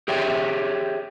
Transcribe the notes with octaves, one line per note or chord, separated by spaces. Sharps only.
G4 G#4 C#5 E5 G5